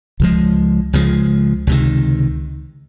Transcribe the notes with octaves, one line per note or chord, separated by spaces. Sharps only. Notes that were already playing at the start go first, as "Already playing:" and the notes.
C#2 C#3 F3 G#3
C#2 C#3 F3 G#3
C#2 C3 D#3